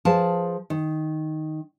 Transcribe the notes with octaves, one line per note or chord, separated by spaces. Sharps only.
F3 G#4 B4 A5
D#3